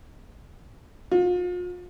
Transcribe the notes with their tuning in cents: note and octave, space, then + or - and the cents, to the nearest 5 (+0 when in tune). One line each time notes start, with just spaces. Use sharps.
F4 +40